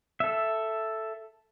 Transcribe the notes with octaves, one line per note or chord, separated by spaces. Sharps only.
A4 E5